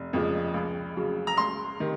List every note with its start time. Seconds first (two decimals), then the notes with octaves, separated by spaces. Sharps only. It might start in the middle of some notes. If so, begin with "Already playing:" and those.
Already playing: F1
0.13 F2 C#3 F3 G#3
0.54 C#2
0.96 C#3 F#3
1.27 A#5
1.37 C#2 C6
1.80 C3 D#3